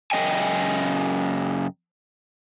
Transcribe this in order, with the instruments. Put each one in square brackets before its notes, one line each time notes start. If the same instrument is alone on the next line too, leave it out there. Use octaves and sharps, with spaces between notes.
[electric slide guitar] F#2 C#3 A3 D#5 G5 G#5